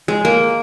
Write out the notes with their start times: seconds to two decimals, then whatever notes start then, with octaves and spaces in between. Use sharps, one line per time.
0.08 G#3
0.25 A#3